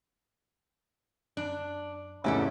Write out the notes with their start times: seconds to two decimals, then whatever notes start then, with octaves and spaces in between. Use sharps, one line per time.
1.37 F#2 D4
2.24 E2 G#2 C3 C#4 E4 G4 A4